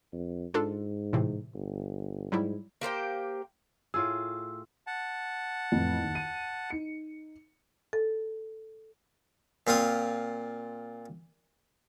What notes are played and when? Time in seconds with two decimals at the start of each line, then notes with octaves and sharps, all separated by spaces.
0.13 F2
0.54 G#2 D4 F4 A4
1.13 A2 C3 E3
1.54 G1
2.32 G#2 F#3 G3 E4
2.81 A#3 G4 C5 G5
3.94 A2 F4 G#4 E6
4.87 F#5 A5
5.72 F2 A2 E3
6.02 D#2
6.15 D#7
6.70 D#4 C#7
7.93 A4
9.67 A#2 C4 F4 D#6